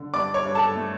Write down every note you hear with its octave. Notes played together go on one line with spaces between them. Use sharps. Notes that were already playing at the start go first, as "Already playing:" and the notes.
Already playing: D3
G2 D5 D6
C#5 C#6
G2
A4 A5
A3